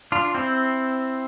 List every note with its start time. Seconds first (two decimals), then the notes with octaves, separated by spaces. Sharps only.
0.12 D4 F4
0.35 C4 E4